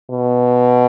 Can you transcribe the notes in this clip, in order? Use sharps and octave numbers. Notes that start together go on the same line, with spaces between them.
B2